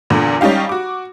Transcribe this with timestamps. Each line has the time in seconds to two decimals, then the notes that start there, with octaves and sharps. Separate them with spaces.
0.10 E2 A#2 D3
0.41 G3 C#4 D#4 G4 F5
0.69 F#4 D6